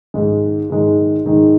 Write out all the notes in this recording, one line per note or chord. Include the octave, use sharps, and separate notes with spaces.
G#2 D#3 G#3
G#2 D#3 G#3
G#2 D#3 G#3